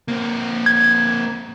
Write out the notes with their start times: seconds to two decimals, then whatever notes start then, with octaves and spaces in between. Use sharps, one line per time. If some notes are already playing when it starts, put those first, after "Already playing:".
0.08 A#3 C4
0.66 G#6